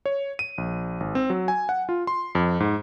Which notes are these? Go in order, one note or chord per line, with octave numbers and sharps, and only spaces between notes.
C#5
D#7
A#1
G#1
C4
F#3
G#5
F#5
F4
C6
F2
G#2